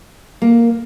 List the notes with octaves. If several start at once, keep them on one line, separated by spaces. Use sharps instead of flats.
A#3